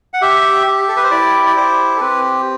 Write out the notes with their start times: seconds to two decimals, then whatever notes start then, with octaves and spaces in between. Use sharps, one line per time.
0.14 F#5
0.22 G4 E5
0.67 G4
0.88 A4
0.96 B4
1.04 C5
1.11 E4 D5
1.47 D5
1.56 G4 C5
1.96 A4
2.00 C4 B4